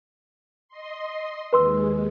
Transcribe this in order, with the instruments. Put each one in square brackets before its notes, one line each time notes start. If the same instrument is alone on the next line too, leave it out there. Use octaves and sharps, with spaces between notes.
[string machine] D#5 C6
[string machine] D#2 G#3 [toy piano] B4 C6 E6